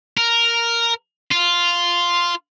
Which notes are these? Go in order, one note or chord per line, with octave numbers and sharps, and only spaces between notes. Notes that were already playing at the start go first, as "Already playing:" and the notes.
A#4
F4